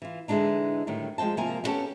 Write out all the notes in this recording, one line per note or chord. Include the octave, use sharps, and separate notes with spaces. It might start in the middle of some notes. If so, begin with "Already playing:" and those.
E3 F4
D3 E3 F3 G#3 D4 D#4
A2 D3 D#3 G3
F3 G#3 C5 G5 A5
C3 F3 A#3 A#4 G#5
D3 G3 B3 C#4 G4 A4